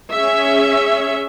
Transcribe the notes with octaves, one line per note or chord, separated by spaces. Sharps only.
C#4 G#4 E5